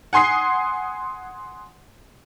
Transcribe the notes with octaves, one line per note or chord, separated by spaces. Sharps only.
F#5 G#5 C6 D#6 C7